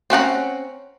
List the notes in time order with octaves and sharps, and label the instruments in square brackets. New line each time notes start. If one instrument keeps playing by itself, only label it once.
[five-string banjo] C4 C#4 F#5 A#5